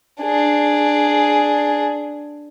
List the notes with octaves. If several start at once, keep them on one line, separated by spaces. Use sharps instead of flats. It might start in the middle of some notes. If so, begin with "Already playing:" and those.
D4 G#4